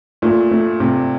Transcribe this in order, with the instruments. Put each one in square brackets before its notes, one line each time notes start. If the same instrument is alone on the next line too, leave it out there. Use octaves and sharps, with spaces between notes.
[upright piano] A#2 [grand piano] A3
[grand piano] A3
[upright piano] C3 [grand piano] A3